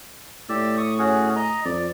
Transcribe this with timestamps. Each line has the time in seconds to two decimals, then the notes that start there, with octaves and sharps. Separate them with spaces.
0.49 A2 G4 D5 E6
0.78 C#6 D#6
0.99 C#4 F#4 G#4
1.36 D#5 A#5
1.65 F2 D5